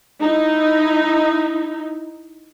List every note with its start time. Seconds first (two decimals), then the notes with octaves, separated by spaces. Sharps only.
0.21 D#4 E4